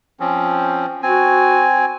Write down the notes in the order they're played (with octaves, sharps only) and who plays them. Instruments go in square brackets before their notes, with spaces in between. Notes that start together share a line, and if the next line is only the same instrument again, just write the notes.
[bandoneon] F3 C4 C#4
[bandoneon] C4 G#5 [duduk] F#4